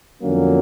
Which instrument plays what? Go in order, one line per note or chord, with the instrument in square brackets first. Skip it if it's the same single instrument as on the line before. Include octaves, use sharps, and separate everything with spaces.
[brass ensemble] F2 D3 F#3 A#3 C#4